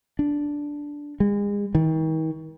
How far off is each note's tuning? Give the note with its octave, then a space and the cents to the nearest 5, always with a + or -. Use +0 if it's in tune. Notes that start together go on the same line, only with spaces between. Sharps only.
D4 -5
G#3 -35
D#3 +40